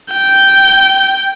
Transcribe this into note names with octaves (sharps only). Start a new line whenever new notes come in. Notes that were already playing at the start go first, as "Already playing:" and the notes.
G5